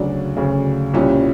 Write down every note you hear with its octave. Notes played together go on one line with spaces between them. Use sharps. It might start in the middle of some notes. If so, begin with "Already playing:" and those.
Already playing: D2 C#3 F#3 D4
D2 C#3 F#3
C2 A#2 G3 C#4